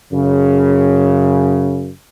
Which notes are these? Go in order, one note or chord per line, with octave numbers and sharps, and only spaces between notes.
F#2 C#3